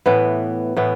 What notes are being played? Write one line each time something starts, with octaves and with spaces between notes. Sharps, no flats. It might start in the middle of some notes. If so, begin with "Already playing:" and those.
A2 E3 B3
A2 E3 B3